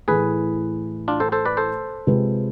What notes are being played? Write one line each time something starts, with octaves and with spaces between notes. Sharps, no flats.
A2 E3 A3 G#4 B4
D4 F4
A4 C5
A4 C5
B4 D5
A4 C5
C3 G#3 C4 F4 B4